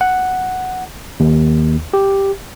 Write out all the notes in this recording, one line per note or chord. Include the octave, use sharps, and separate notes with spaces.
F#5
D#2
G4